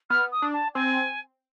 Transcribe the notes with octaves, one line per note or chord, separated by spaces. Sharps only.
B3 F6
D#6
D4
A5
C4 G#5